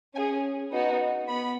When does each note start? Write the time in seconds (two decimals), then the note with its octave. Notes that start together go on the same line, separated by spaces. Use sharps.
0.15 C#4 G#5
0.19 G#4
0.72 B3 D#4 F#4
1.29 B3 B5